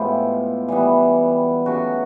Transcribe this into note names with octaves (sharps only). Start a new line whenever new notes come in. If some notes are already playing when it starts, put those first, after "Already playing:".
Already playing: A2 F3 G#3 B3 F4 G4
E3 G3 B3
C#3 F#3 A3 F#4